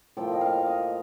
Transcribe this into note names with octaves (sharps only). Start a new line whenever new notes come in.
A2 F3 A#3 G5
D#5
F5
D#5